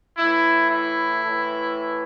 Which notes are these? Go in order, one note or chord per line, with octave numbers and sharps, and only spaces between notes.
A2 E3 E4
E4
A2 E3